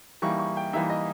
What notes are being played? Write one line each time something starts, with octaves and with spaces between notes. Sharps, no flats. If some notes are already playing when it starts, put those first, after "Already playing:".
E3 G3 A#3 D#4 C#6
C#6
G5
E3 G3 A#3 D#4 E5
D#5